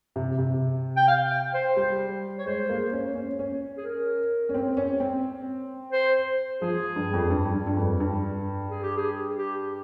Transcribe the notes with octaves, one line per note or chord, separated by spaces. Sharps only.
C3
C3
G5
F5
G5
C5
G3
C#5
G#3 C5
A#3
C#4
C#4
C#4
G#4
A#4
C#4
C4
C#4
C4
C5
F3 G#4
G2
F2
G2
G2
G2
F2
G2
G#4
G4
G#4
G4